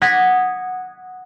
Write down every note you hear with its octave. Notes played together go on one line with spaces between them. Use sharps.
F#5 D#6 G#6 A#6 B6